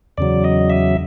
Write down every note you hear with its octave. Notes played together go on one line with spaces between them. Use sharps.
E2 C#3 F#3 D5
D#5
E5